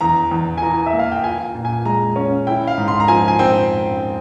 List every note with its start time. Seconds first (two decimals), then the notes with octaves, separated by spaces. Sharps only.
0.01 E2 A#5
0.31 E2
0.58 G#5
0.62 E3 A#5
0.86 E5
0.93 A#3
0.99 F5
1.12 G5
1.24 F4 G#5
1.55 A#2
1.65 G#5
1.85 G#3 A#5
2.16 C#4
2.47 E4 G5
2.67 F5
2.78 G#2
2.88 C6
3.00 A#5
3.08 F3 G#5
3.28 G#5
3.39 C4 G5